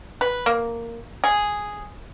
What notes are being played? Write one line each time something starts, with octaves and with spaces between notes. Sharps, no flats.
B4
A#3
G#4